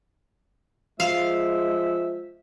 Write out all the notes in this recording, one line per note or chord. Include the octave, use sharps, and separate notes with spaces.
F3 G#3 E5 F5